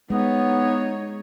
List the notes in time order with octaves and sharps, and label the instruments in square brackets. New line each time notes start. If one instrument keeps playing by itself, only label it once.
[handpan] G#3 [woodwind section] B3 [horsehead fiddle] D#4 C#5